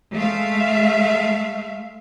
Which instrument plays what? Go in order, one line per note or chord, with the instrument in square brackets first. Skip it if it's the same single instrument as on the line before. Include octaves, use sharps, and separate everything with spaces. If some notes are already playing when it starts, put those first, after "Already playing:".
[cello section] G#3 A3 E5 F5